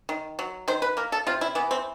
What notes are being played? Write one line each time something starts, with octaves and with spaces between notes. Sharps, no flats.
D#3
F#3
D#3 C5
B4
A#3 A#4
A4
C3 F4
E4
E3 B3
C4